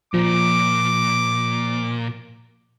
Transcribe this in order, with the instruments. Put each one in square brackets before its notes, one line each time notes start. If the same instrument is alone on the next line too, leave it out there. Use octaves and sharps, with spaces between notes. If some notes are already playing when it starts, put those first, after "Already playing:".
[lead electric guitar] A#2 [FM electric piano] F3 [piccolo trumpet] D6